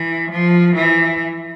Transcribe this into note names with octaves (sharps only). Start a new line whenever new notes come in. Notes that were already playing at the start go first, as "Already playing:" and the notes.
Already playing: E3
F3
E3